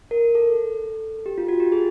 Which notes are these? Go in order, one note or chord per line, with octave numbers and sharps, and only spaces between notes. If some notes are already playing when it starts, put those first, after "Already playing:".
A#4
A4
G4
F4
F#4
G4
G#4